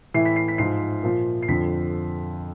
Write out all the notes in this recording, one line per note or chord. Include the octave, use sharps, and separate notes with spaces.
A2 E3 C7
B6
C7
B6
G#2 F3 C7
A#2 F3
C7
F2 D3 F3 B6